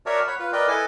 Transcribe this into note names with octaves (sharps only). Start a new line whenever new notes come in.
F#4 A#4 C#5 D5 E5 A5
C#5 F#5 B5
F4 B4
A#4 B4 D5 D#5 G5
E4 A4 B4 D#5 G#5 A5